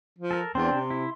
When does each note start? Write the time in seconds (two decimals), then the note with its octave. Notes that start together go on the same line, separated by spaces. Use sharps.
0.19 F3
0.31 A4 A#4
0.55 E2 C4 D4 C6
0.72 C3
0.91 E4